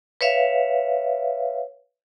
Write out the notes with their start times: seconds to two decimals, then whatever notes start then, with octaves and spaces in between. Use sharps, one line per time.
0.21 B4 C#5 E5 F5